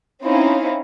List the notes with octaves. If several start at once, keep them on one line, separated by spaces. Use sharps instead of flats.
C4 C#4 D#4 E4 F5